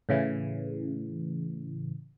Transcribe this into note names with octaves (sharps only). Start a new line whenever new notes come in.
A2 C#3 E3